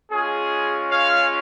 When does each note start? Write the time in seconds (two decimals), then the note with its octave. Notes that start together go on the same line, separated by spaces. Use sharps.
0.11 G#3 C#4 F4 G#4
0.90 C#5 F5